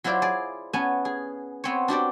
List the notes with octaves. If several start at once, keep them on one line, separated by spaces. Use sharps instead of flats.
F#3 E4 F4 C5 D5
G#4 D5
B3 C#4 G#5 A5
G#4
B3 C4 C#5
D4 F#4 G4 D5